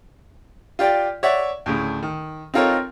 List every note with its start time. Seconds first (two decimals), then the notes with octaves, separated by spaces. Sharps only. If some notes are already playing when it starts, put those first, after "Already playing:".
0.79 F4 G4 D5 G5
1.23 C#5 D5 E5 F#5
1.66 D2 A2 C#3
2.03 D#3
2.54 C4 D#4 F4 A4 A#4 C#5